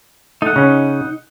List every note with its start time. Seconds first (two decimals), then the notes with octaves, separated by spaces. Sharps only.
0.42 A3 D#4 F#5
0.56 C#3 C#4